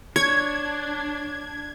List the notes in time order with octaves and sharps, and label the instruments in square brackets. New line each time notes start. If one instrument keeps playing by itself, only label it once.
[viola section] D4 [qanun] C#5 [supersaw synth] G#6